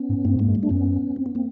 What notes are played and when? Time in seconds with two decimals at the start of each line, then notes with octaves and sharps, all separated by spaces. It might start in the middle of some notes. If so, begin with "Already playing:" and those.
Already playing: B3 C#4
0.09 G#2
0.24 G2 A#3 C4
0.36 G#2 G#3 A#3
0.47 G2
0.55 G3 A3
0.63 D4
0.69 F#2 B3 C#4
1.16 C4
1.26 B3
1.35 A#3 C4